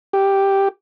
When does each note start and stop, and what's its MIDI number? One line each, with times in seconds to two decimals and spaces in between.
0.13 0.68 67